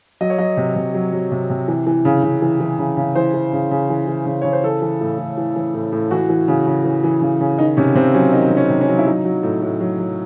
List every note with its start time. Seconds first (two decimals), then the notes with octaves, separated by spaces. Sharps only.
0.21 F#3 D#5
0.30 C#5
0.38 F#3 D#5
0.57 C3
0.76 C3
0.94 F#3
1.12 F#3
1.31 C3
1.50 C3
1.68 E3
1.87 E3
2.05 C#3
2.23 C#3
2.42 E3
2.60 E3
2.79 C#3
2.97 C#3
3.15 E3 C5
3.34 E3
3.53 C#3
3.71 C#3
3.90 E3
4.08 E3
4.26 C#3
4.42 C#3 C#5
4.53 C5
4.63 E3 A4
4.82 E3
5.01 A2
5.19 A2
5.37 E3
5.56 E3
5.74 A2
5.92 A2
6.11 E3 F#4
6.29 E3
6.48 C#3
6.67 C#3
6.84 E3
7.04 E3
7.22 C#3
7.40 C#3
7.58 D#3 D#4
7.77 C3 C#4
7.95 C3 C4
8.14 F#3 C#4
8.33 D#3 D#4
8.50 C3
8.57 C#4
8.70 C3
8.81 C#4
8.88 F#3
8.99 E4
9.07 F#3 D#4
9.25 F#3
9.43 A2
9.62 A2
9.81 F#3
9.99 F#3